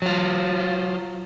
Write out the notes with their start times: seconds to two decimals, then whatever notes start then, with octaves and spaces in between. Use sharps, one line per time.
0.02 F#3 F4